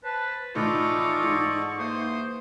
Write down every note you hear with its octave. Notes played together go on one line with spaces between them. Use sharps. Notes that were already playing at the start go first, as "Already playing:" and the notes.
B4 C5 A5
A2 D#3 E3 F4 A4 D5 D#5 C#6
G#2
E3 A#3 C5 D#6